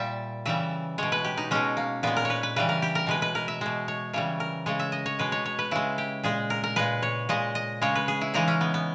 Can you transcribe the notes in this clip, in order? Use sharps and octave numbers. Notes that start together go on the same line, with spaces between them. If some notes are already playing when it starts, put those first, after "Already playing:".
Already playing: A#2 G3 E5
C#3 E3 G3 E5
B2 G#3 C#5
B4
G4
D#4
B2 G#3 C#4
A#3
A#2 G#3 B3
A#4
C#5
B4
B4
C#3 E3 G3 B4
A#4
G4
A#4
B2 G#3 B4
B4
A#4
E5
B2 G#3
C#5
C#3 E3 G3 C#5
A#4
C#3 G#3 C#5
E5
D#5
C#5
B2 G#3 B4
C#5
C#5
B4
C#3 G#3 E4
G4
A#2 G#3 G#4
A#4
A#4
A#2 G#3 B4
C#5
A#2 G#3 D#5
D#5
C#3 G#3 C#5
B4
G#4
E4
C#3 E3 G#3 D#4
C#4
B3
B3